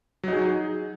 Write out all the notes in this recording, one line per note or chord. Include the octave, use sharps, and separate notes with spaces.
F#3 D#4 G#4